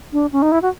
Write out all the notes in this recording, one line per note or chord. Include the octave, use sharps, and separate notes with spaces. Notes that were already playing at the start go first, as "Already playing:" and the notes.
D4
C#4
D#4
E4
F#4